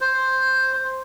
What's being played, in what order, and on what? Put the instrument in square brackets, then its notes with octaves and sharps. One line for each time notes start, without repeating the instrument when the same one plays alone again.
[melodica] C5